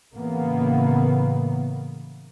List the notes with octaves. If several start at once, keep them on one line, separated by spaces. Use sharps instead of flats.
A2 C#3 E3 A#3 B3